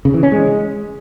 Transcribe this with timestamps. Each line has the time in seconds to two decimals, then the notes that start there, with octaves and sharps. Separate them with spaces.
0.05 C#3
0.14 E3
0.23 C#4
0.32 G#3